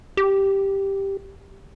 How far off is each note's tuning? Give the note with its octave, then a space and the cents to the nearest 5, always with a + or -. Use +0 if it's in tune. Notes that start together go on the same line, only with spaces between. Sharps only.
G4 +0